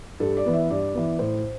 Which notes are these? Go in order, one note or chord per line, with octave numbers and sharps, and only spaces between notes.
G2 A4
D5
E3 B3
E5
G2 D5
E3 B3
A2 C5